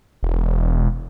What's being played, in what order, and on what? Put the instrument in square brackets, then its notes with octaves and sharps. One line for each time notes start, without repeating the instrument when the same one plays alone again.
[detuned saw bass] E1